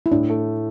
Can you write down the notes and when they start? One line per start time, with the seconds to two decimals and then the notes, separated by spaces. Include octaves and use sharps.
0.06 E4
0.11 A2 D4
0.30 A3